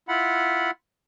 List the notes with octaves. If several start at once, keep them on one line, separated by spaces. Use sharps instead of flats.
E4 F4 F#5 B5